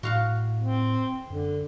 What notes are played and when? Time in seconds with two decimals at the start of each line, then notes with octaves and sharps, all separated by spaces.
0.03 A2 F#4 F5 F#5
0.58 C4
1.30 F#2 D3